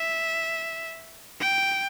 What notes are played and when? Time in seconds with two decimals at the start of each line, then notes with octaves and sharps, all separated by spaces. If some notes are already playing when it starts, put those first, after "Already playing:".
Already playing: E5
1.41 G5